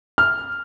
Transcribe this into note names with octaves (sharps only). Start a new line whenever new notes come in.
F6